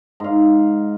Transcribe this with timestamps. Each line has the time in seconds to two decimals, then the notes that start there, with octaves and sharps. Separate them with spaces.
0.20 G#2 F5